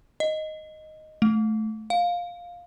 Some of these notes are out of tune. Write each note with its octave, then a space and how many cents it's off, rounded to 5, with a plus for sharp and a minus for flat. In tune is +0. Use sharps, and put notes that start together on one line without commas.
D#5 +0
A3 -15
F5 +10